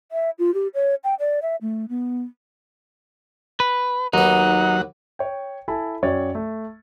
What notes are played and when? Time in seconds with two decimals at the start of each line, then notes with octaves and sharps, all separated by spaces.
0.12 E5
0.39 F4
0.54 G4
0.74 C#5
1.04 G5
1.20 D5
1.42 E5
1.62 A3
1.89 B3
3.60 B4
4.13 D#2 F#3 B3 D#4 F#5
5.19 C#5 G5
5.68 E4 A4 G#5 A5 B5
6.02 F#2 F#3 C#5 D5 G5 A6
6.35 A3